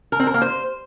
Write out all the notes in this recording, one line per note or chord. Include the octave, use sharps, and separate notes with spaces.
A#4
C4
A#4
A#3
C5